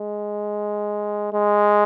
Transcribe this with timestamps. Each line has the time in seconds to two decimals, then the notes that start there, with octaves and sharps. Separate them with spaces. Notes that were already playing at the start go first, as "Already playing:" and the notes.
Already playing: G#3
1.33 G#3